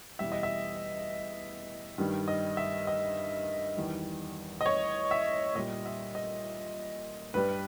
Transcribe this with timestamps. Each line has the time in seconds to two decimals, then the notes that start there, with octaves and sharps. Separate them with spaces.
0.19 E2 B2 G3 E5
0.32 D#5
0.43 E5
1.98 G2 D#3 G3
2.28 D#5
2.57 E5
2.87 D#5
3.77 E2 D#3 G3
4.61 D#5
4.66 C#5
5.11 E5
5.55 A#2 G3 D#5
5.86 E5
6.15 D#5
7.34 G2 G3 B4